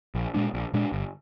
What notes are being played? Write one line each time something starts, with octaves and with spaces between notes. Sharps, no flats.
A#1
A#2 G#3 D4
A#1
A#2 G#3 D4
G1